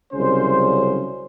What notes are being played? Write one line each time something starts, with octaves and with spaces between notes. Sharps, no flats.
C2 C#3 F#3 C#4 C5